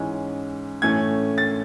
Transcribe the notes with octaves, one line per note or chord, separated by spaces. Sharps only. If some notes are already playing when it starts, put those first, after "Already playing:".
Already playing: G#2 E3 G#3 C#4
A2 E3 A3 C#4 G#6
A6